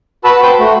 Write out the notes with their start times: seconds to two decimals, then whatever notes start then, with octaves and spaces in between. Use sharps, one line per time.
0.24 F#4 B4 A5 B5 E6
0.42 B4 C5 G5 A5 G6
0.59 A3 F#4